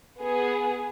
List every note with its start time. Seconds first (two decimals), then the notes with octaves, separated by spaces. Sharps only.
0.22 B3 G#4